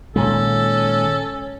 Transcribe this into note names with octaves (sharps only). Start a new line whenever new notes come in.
A#2 D#3 G#3 C#4 A4